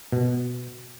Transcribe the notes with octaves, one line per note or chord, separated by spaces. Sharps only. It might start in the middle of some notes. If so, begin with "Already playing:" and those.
B2